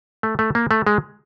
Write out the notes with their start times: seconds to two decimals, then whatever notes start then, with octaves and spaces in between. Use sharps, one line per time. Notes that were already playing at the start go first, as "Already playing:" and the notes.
0.23 A3
0.39 A3
0.55 A#3
0.71 A3
0.87 G#3